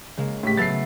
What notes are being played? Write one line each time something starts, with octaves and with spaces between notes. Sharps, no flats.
C#3 G#3 A#3
A2 G4 B6
F#3 A3 B3 A6 C7